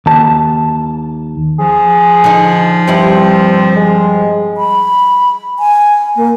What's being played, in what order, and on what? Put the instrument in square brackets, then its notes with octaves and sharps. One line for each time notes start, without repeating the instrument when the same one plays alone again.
[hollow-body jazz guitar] D#2 A5
[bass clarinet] F3 [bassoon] G#4
[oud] D3 D#4
[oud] G2 G3 E4 [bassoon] C4
[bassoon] G#3
[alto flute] B5
G#5
A#3